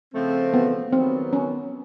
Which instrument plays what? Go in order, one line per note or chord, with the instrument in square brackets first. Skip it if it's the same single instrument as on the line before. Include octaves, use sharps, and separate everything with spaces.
[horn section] C#3 F3 A3 C4
[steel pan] B3
[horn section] D#3 F#3 B3 [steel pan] C4
[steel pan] C#4